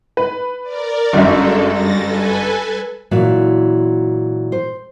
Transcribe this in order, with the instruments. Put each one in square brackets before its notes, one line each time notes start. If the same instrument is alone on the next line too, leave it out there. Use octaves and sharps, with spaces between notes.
[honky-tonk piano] B4
[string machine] A#4 D5
[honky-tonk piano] G1 F#2 E5 [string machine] G#3 A4
[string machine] G3 A6 A#6
A4 B4 G#5
[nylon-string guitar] A#2 E3 F#3
C5